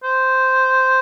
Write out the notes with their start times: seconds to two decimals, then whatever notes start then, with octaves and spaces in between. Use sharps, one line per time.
0.04 C5